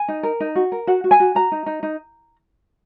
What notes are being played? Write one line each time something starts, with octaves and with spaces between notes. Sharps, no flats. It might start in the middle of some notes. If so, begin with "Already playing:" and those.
Already playing: G#5
D#4
A#4
D#4
F#4
A#4
F#4 F#5
F#4
G#5
F#4
F#4 A#5
D#4
D#4
D#4